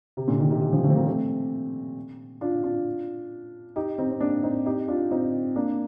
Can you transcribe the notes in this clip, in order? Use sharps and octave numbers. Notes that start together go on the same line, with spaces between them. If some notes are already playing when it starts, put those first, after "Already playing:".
C3
A#2 D3
C3 D#3
C3 D#3
C3 D#3
D3 F3
F3 A3
C4
G3 A#3
A3 C4
D4 F4
D4 F4
D#4 G4
C4 D#4
C4
A#3 D4
C4 D#4
D#4 G4
D4 F4
C4 D#4
A#3 D4